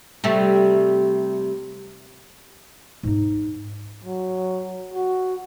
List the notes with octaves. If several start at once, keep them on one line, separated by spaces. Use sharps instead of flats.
C3 G3 A3
G#2 D#4
F#3
F#4